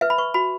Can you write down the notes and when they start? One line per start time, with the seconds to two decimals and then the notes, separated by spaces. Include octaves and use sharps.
0.01 B4 E5
0.10 B5
0.18 B4 C#6
0.34 F#4 B5